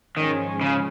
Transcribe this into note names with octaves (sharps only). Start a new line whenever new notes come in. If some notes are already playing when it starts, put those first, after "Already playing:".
G#2 D#3 F3 G#3 C#4
C#3